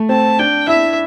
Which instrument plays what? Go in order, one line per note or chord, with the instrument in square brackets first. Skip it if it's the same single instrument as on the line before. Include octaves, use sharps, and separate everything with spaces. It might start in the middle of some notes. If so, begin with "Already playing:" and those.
Already playing: [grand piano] A3
[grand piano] C4 [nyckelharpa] A5
[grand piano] D4 [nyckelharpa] G5
[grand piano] E4 [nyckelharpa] E5